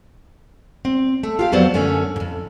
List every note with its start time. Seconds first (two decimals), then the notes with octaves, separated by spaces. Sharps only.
0.85 C4
1.23 A3
1.39 F4 G4 F5
1.52 F2 F3 F#3 B3 C5 D5
1.74 F#2 D3 A3 C#4
2.16 F2 G#2